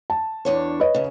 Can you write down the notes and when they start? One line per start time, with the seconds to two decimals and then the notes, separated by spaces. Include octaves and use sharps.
0.10 A5
0.45 E2 D4 C#5
0.80 B4 C#5 D#5
0.94 F#2 C#3